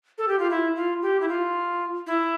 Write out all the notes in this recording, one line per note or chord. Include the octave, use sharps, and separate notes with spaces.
A4
G4
F4
E4
F4
G4
E4
F4
E4